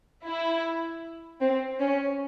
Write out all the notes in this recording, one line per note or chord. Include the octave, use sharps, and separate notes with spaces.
E4
C4
C#4